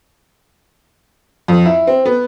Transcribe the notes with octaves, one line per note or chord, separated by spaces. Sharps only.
F2
E4
C4
B3